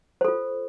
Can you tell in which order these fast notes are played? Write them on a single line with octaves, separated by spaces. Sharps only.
C5 A4 F4